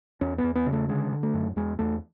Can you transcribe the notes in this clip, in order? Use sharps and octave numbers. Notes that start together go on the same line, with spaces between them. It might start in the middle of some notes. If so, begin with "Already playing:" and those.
E2 C#4
B3
E2
B3
C#3
A3
D3 G#3
D3
A3
F#2
E2 G#3
E2 A3